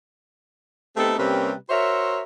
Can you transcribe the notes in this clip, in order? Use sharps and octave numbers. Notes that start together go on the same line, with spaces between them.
A3 B3 C4 D#4 G4 A4
C3 G3 A#3 C4 C#4 B4
F#4 A#4 C5 C#5 E5